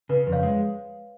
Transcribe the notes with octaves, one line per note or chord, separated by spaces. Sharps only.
C#3 B4
F2
C#5 F5
G#3